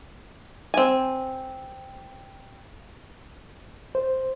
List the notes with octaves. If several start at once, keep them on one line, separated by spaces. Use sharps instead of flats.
C4 G#5
C5